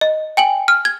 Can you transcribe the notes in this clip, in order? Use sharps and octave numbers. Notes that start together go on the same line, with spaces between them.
D#5
G5 G#5 F#7
F6
G#6